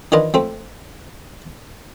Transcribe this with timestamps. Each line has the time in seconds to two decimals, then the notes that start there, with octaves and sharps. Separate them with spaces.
0.12 D#3 E3 D4 F4 A#4 D#5
0.34 F3 A3 C4